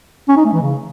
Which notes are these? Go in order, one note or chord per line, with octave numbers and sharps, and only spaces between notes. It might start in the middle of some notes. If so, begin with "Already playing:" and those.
C#4
D#4
A3
E3
C#3